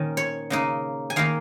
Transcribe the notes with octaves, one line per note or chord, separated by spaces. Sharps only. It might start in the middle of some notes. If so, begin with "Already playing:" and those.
Already playing: A#2 D#3 C#4
C#5
C#3 A#3 D#4
G#5
D#3 A#3 D#4 F5